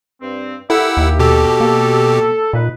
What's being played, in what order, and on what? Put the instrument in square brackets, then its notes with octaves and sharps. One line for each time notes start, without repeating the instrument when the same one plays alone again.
[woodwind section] G2 C4
[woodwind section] A#3 G4 E5 [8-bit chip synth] E4 F#5 E6 [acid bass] A4
[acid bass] D#2
[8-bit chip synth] B2 G4 [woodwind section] A4
[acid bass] A#3
[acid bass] A#2 [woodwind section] D#4 B4